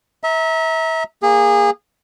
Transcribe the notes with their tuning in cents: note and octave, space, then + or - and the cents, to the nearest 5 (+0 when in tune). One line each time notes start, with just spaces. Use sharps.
E5 -30 A#5 +0
A#3 +5 G#4 -25